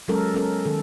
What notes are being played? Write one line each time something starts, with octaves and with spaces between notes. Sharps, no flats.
F#3 G#3 C#4 A4 A#4
B3 C#4 A4 A#4
D#3 A4